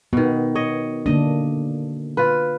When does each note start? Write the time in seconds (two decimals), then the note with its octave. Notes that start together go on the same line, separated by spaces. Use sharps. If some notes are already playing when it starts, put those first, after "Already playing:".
0.13 B2 D#3 B3
0.55 C#5 D#5
1.06 D3 A#3 D4 D#5
2.17 F4 B4